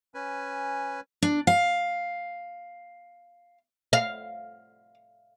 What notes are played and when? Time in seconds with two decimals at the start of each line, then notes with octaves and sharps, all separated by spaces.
0.14 C#4 B4 G#5
1.22 D4
1.47 F5
3.93 F5